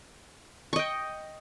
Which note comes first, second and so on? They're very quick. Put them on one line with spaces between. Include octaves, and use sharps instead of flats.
C#6 D#5 G5